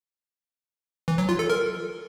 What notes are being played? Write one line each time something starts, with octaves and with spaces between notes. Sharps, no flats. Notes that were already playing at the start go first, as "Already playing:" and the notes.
E3
F#3
F4
A4
A#4